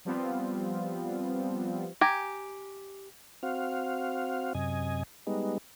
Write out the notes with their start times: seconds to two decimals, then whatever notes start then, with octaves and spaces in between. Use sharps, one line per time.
0.05 F3 G3 B3 C4 F4
2.01 G4 G#5 A#5
3.43 C4 F#4 F5
4.55 F#2 C3 D#5 G#5
5.27 G3 G#3 B3 D#4